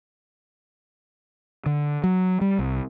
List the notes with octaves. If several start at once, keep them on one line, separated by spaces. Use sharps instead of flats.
D3
F#3
G3
C2